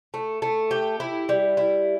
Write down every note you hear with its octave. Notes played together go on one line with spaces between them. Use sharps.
A3
A3
G4
E4
G3
E4